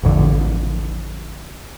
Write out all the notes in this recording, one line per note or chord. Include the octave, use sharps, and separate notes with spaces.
A1 F2 D3